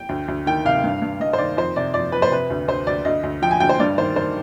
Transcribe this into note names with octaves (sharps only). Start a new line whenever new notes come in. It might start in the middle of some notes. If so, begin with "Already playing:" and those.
Already playing: G5
D2
D2
D#3 G5
C3 F5
G2
G2
G2 D#5
C5
D#3 D5
F2 C5
C3 D5
F2 D5
F2 B4
C5
C3 B4
D2
D2 C5
D2 D5
D2 D#5
D2
F3 G5
G#5
D2 G5
C5
G2 D5
D#3 C5
D#3 C5